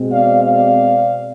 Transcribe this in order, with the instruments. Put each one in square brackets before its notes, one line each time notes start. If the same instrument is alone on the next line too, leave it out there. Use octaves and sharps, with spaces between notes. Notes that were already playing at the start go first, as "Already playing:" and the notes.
Already playing: [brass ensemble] B2 G#3 C4
D5 F5
D5 F5